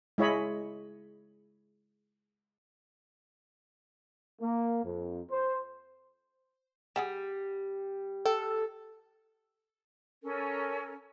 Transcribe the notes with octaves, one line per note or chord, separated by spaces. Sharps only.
G#3 E4 C#5 D#5 B5
A#3
F2
C5
G3 G#4 F#5 G#5
A4 G5
C#4 A4 A#4